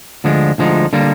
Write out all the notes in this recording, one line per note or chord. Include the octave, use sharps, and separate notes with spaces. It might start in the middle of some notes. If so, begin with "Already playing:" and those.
D2 D3 F3 G#3 D4
D2 D3 F3 G#3 D#4
D3 G3 A#3